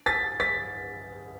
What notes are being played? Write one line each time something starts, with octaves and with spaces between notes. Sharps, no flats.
A6 B6
A6 B6